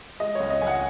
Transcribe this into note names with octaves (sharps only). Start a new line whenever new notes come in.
G#3 D#5
C#2 C#5
D#5
C#2 G#5
F#5